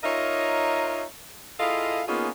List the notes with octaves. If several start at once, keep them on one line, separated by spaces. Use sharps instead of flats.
D#4 F4 A#4 C#5 D#5 E5
E4 F4 G#4 A4 D#5 F5
A#3 B3 C#4 D#4 F4 G#4